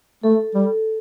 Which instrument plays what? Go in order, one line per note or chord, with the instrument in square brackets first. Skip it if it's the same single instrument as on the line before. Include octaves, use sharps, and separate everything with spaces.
[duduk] A3 [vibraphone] A4
[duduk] G3